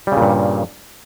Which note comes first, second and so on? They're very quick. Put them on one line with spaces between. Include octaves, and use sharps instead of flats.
G3 C#3 A#2 G2